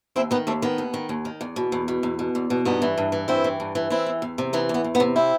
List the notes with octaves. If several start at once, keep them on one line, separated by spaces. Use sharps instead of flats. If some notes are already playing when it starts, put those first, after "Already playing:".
D#2 C4 E4
D#3 B3 D#4
D#2 A3 C4
D#3 B3
D#2
D#3
D#2
D#3
E2
B2
E2
B2
E2
B2
E2
B2
G2 B3 D#4
E3
G2
E3
G2 C4 E4
E3
G2
E3
E3 C4 E4
E2
E2
C3
E3 B3 D#4
E2 B3
E2
B3 D#4
C3
C4 E4